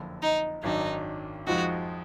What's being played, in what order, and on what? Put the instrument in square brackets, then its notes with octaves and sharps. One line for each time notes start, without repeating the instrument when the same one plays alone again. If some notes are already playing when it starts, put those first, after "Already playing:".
Already playing: [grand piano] F#1 F2 D3
[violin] D#4
[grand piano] G#1 F#2 D#3 F#3 D4 [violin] D#4
[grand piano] F2 F3 G#3 D#4 [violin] F#4